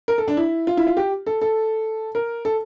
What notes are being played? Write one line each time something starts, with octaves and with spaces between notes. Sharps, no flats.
A#4
A4
D4
E4
F4
E4
F4
G4
A4
A4
A#4
A4